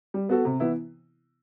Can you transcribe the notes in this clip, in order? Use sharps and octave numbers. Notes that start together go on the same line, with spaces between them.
G3
B3 F#4 A4
C3
E3 B3 E4